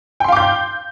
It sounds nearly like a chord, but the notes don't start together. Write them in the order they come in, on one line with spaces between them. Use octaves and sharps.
G5 C6 F5 D6 G6